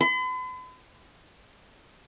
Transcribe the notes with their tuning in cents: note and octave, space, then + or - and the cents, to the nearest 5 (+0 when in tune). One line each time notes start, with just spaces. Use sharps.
B5 +45